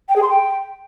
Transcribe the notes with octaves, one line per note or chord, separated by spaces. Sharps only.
G5
G#4
C6
G5